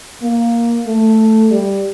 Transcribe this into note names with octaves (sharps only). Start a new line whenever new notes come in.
A#3
A3
G3